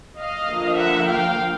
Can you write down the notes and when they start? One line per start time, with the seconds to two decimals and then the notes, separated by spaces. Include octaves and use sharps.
0.18 D#5 F5
0.48 D3 F3 A#3
0.78 E5 F#5
1.07 F5 G5